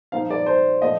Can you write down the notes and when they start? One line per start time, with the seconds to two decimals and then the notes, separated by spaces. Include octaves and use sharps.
0.12 A#2 F3 C4 D#4 F5
0.30 D5
0.46 C5
0.81 A#2 F3 A3 D#5